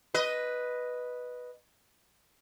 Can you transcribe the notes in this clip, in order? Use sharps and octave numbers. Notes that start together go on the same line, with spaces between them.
B4 D#5